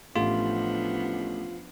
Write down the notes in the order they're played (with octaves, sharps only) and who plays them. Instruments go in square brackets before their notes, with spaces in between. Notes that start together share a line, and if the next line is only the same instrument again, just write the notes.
[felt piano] A1 A3 G4 [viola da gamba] F3 B3 D4 [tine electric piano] F4